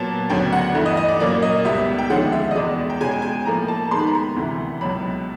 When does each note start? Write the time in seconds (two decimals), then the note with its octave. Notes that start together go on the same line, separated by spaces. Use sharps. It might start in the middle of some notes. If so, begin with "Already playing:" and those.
Already playing: A#2 F#3 B3 A5
0.29 D2 C#3 F#3 B3 G5
0.53 F#5
0.74 G2 E3 A3
0.86 D#5
0.97 D#5
1.09 D5
1.20 A#2 F#3 A#3 C#4 D5
1.42 D#5
1.65 C#2 B2 G3 B3 E5
1.98 G5
2.10 D#2 D3 F3 G#3 C#4 F#5
2.32 E5
2.51 D#5
2.55 E2 B2 G#3 D5
2.67 D5
2.90 G5
3.01 B2 G#3 C#4 G#5
3.11 G5
3.22 G#5
3.45 A2 F3 A#3 A#5
3.68 A5
3.91 D#2 D#3 G#3 B3 C6
3.99 B5
4.07 A#5
4.15 B5
4.36 D2 C3 E3
4.81 C#2 B2 F#3 B5